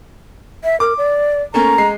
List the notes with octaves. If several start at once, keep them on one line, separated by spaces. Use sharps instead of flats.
E5
A#4 D6
D5
A3 A#3 C#4 A#5
G#3 C7